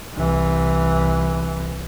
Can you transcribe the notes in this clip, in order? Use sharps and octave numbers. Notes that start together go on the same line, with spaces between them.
C2 E3